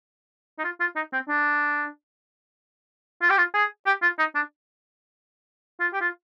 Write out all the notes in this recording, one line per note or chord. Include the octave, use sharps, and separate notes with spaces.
D#4
F4
F4
D#4
C4
D4
F4
G4
F4
G#4
G4
F4
D#4
D4
F4
G4
F4